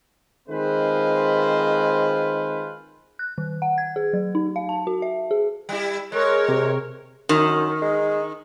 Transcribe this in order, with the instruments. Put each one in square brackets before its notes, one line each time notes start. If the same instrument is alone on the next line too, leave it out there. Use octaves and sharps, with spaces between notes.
[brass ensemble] D#3 G#3 C4 F4 B4 C5
[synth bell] F#6
D#3
F#5
G#6
G#4
F#3
D#4
F5
A5
F#4
E5
G#4
[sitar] G3 E4
[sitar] G#3 [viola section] A#4 C#5
[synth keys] C3
[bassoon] F#2 [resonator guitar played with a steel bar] D#3
[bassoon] G#3